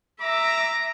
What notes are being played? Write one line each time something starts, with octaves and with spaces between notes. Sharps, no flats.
E5 A#5 D6